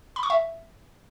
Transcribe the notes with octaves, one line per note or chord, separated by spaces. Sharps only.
B5
C#6
E5